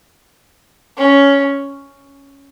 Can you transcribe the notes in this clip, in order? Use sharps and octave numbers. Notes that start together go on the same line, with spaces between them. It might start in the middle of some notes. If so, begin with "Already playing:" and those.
C#4